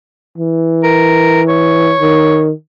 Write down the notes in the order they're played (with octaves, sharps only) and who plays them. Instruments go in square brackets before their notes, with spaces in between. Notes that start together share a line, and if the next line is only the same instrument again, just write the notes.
[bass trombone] E3
[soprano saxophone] A#4
C#5
[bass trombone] D#3